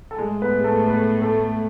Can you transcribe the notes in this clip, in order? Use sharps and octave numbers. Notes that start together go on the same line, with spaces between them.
A4
A2 G#3 G#4
B3 B4
G#4
A3 A4
B3 B4
A3 A4